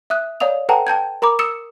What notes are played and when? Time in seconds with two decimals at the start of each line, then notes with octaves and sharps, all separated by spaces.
0.10 E5 D#6 F#6
0.40 C#5 D5 F5 D#6 F7
0.69 A4 B4 F#5 G5 A5 A#5
0.87 G5 A5 G6 G#6
1.22 A#4 A#5 B5 D6
1.39 D#6 E6 C#7 E7